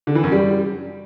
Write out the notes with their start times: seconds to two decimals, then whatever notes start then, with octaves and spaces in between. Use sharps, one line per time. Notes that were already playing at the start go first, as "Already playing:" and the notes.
0.07 D3
0.15 E3
0.24 F#2
0.32 G3